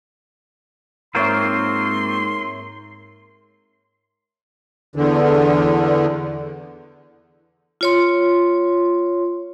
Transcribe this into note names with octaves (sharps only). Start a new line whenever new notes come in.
G#2 A#3 C4 F4 A#4 C#5 E5 C6
E2 D3
F4 C#5 C6